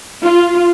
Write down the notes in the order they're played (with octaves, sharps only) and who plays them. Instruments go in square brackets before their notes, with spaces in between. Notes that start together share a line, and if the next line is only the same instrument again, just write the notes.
[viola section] F4